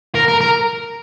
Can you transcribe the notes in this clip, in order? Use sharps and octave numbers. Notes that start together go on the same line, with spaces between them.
A#4
A#4
A#4